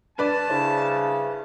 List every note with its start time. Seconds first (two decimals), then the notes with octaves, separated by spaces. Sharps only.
0.18 G2 B4 D5 A5
0.49 C#3 D4 E4 C5